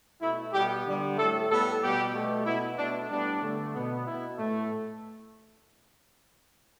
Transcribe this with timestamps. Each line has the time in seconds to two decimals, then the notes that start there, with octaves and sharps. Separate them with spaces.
0.21 B2 A3 E4
0.53 B2 G3 B3 G4
0.86 D3 G3 B3
1.18 A2 A3 A4
1.49 A2 G3 B3 A4
1.82 B2 G3 B3 G4
2.14 B2 A3
2.45 B2 B3 E4
2.78 B2 A3 D4
3.09 A2 G3 B3 D4
3.42 D3 A3
3.74 B2 B3
4.06 B2 B3 E4
4.38 A2 A3